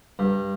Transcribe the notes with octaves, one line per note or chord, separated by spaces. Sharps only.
G2